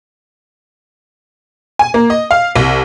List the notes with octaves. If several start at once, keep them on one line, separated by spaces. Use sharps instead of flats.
G#5
A#3
D#5
F5
C2